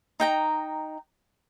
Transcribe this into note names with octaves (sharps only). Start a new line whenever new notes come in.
D#4 G5 A#5